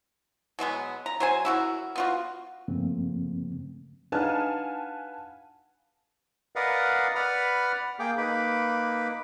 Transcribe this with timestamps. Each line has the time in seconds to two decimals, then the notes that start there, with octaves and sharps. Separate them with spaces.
0.59 B2 F#3 G#3 B3
1.06 A#5
1.20 F#3 C5 G#5
1.45 E4 F#4 A#4
1.96 B3 F4 F#4
2.68 G2 C#3 F3 A3 A#3 C4
4.12 D4 D#4 B4 F5 F#5 G#5 A5 F6
6.56 A#4 B4 D5 D#5 F5 F#5
7.15 B4 D5 F#5 B5 F6
7.99 A#3 G#4 G5 D6
8.18 A#3 D#4 B4 B5 D6